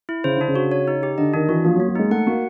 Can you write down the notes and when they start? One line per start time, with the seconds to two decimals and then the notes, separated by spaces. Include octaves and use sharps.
0.09 E4
0.24 C#3 C5
0.36 D3 D4
0.48 C#3
0.55 F#4
0.71 C#5
0.88 D#4
1.03 G4
1.18 D3 D#5
1.34 D#3 D4
1.49 E3 F#4
1.64 F3 A#3
1.76 F#3
1.80 A#3
1.88 F#3
1.95 G#3 D#4
2.11 A3 F#5
2.27 A#3 F#4